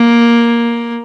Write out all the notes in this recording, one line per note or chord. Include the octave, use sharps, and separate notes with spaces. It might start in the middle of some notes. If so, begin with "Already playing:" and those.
Already playing: A#3